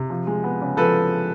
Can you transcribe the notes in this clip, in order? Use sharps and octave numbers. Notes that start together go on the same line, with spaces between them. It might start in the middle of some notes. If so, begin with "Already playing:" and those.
Already playing: C3
F3
G#3
B3
C#3
F3 A4 B4